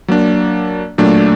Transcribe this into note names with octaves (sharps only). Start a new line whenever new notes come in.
F#3 A#3 D4
A#2 F#3 A3 D4